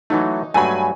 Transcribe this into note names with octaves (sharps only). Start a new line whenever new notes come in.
E3 F#3 A3 D#4
G2 F#3 A3 G#5 B5